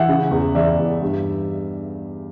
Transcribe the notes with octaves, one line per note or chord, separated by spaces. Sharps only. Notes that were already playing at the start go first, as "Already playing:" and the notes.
Already playing: E3 E5 F#5
C#3
E2
E2 D5 E5
E2
G2